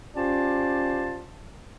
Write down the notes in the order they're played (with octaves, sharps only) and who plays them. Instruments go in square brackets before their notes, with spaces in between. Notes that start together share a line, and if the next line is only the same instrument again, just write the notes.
[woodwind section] C#4 F4 G4 C5 D5 A5